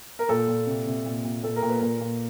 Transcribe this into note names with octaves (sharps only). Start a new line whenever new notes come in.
A#4
A#2 A4
A#2
C3
C3
A#2
A#2
A#2 A4
A#4
A#2
B4
A#2 A#4
A#2